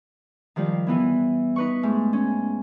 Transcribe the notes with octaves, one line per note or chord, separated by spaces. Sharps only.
D#3 F3 G3 F4
E3 B3 E4
D#4 B4 C#6
G#2 A3
C#4